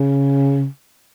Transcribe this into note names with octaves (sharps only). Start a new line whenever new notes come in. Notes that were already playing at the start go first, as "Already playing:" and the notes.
Already playing: C#3